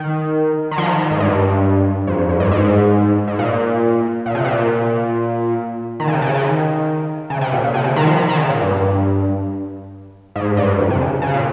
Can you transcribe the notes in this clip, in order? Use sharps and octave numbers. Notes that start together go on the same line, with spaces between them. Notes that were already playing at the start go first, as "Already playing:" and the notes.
Already playing: D#3
D#3
F3
D#3
D#3
G#2
G2
F2
F2
F2
G2
G#2
G#2
A#2
A#2
C3
A#2
D#3
C#3
C3
C#3
C#3
D#3
C#3
C3
A#2
A#2
C3
C#3
D#3
F3
D#3
D#3
C#3
A#2
G2
G#2
G2
F2
C3
C#3
C#3
A#2